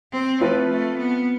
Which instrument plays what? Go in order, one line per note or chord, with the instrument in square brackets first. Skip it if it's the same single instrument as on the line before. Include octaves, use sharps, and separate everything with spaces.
[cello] C4
[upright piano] F3 C4 F4 B4 [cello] A3
[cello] A3
B3